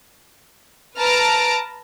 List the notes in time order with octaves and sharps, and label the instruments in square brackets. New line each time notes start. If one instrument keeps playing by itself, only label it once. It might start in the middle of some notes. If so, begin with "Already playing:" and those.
[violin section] B4 A5 A#5 F6 D7